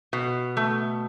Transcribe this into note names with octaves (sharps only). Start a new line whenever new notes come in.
B2
A3